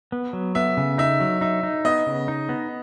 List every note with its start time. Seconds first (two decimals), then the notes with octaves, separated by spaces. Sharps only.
0.12 B3
0.33 F#3
0.55 B3 E5
0.77 C#3
0.98 D#4 E5
1.20 F#3
1.41 D#4 E5
1.63 D#4
1.85 B3 D#5
2.07 C#3
2.28 D#4
2.49 B3